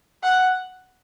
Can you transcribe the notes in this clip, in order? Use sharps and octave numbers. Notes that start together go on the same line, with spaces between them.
F#5